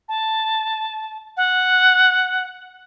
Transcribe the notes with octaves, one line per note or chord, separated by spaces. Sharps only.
A5
F#5